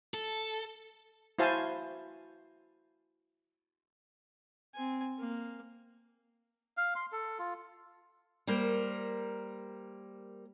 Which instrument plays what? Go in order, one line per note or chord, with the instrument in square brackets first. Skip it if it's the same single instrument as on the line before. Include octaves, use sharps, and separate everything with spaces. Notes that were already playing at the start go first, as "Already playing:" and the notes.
[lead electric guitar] A4
[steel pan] E4 F#4 C5 F5 G#5 A5
[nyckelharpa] C4 G#5
A#3
[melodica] F5
C6
A4
F4
[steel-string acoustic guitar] G3 A#3 A#4 C5